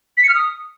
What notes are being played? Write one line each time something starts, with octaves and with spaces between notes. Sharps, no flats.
B6
C#7
F6
D#6